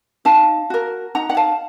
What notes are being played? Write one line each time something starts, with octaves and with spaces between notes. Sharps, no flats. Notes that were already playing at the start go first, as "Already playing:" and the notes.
D#4 F5 A5
F#4 A#4
D#4 F#5 A#5
F#5
F5 A5